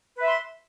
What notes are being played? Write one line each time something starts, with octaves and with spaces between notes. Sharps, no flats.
B4 E5 C6